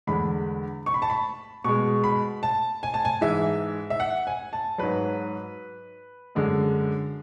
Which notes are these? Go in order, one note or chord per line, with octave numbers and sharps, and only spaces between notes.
E2 D3 G#3 B5
C#6
B5
A5
B5
B2 G#3 C#6
B5
A5
G#5
A5
G#5
G#2 E3 G#3 E5
E5
F#5
G#5
A5
G#2 F#3 B4
F#2 D3 G#3